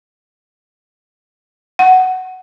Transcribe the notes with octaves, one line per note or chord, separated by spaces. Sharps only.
F#5